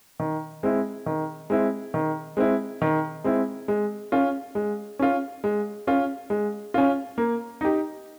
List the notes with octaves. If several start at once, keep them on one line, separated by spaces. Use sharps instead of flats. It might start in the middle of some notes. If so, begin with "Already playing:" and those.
D#3
G#3 C4 E4
D#3
G#3 C4 E4
D#3
G#3 C4 E4
D#3
G#3 C4 E4
G#3
C#4 F4
G#3
C#4 F4
G#3
C#4 F4
G#3
C#4 F4
A#3
D#4 G4